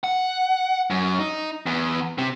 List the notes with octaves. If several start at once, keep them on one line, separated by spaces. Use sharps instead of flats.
F#5
F#2
D#4
E2
C3